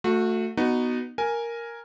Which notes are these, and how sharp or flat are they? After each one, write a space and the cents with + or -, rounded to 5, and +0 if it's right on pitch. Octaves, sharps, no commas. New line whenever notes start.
A3 +15 F#4 -20
B3 +0 D#4 -15 F#4 +5
A#4 +0 G#5 +0